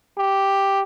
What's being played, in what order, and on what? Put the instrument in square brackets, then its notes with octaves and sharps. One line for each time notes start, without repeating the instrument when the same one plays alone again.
[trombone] G4